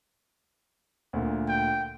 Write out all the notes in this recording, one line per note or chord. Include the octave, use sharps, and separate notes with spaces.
D2 A#2
G5